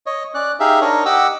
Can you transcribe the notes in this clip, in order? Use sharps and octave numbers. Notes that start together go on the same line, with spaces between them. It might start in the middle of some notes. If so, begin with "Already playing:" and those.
C#5 D#5
C#4 D5 F#6
D#4 G4 G#4 E5 F5
D4 D#4 A#4 C#5 D#5
G4 D#5 F#5 D6 E6